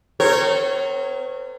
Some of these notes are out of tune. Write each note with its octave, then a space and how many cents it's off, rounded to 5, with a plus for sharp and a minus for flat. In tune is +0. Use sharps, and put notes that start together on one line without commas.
C4 -45 A#4 -30 C#5 -15